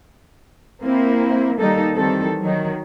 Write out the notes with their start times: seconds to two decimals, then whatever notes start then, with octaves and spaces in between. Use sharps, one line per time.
0.83 A#3 C4 E4
1.59 D#3 G3 A#3 D#4 A4
1.94 D#3 E3 G3 C4 A4
2.41 D#3 F#3